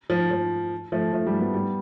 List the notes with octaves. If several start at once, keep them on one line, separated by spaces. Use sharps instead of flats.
F3
F3
F3 A3
F3 A3
G3
G3 B3
G3 B3